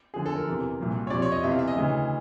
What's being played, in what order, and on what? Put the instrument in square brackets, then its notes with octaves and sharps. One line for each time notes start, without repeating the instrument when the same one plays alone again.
[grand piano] F#2 D3 F3 G#4
A4
A#4
E2 C3 E3
C2 A#2 F#3
C#5
F2 C3 F3 D5
C#5
D#5
E2 C3 E3 E5
F5
E5
D#5
D2 C#3 E3